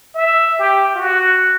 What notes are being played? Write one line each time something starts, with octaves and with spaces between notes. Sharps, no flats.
E5
G4
F#4